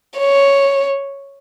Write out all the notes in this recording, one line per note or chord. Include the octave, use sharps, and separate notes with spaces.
C#5